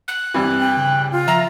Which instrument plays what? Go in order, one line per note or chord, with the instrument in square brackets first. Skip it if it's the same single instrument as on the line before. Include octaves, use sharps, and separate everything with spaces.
[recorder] F#6
[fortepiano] G2 E3 [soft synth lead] C4
[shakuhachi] G5
[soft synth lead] C#3
[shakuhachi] F4
[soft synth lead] F3 [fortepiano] E5 [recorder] A#5